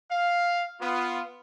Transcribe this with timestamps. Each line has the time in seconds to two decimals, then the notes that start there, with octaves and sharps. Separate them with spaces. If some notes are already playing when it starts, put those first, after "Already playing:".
0.10 F5
0.80 B3 F4